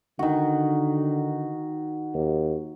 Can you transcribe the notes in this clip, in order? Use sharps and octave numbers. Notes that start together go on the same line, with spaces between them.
D3 D#3 F#4
D#2